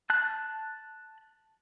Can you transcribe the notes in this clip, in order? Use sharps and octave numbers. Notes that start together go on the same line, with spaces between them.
A5 F#6